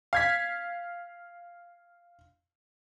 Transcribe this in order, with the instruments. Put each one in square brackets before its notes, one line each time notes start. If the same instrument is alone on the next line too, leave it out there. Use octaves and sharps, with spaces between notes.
[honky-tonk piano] F5 G#6 B6